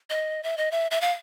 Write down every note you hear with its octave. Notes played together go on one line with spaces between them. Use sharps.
D#5
E5
D#5
E5
E5
F5